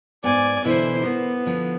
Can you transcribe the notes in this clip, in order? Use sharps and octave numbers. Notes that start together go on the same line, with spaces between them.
G#2 B3 D5 G#5
B2 D3 E3 E4 C5
B3 A#4
D3 F3